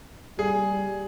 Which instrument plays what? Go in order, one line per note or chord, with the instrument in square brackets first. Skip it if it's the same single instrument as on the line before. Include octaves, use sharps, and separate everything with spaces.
[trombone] G3 [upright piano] G#4